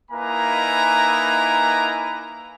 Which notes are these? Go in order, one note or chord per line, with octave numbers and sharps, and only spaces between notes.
A#3 D#4 E4 B4 G#5 A#5